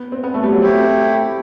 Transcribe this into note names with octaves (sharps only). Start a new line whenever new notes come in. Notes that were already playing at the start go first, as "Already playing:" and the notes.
Already playing: B3
C4
B3
A3
G3
F#3
A3 C4 E4 G4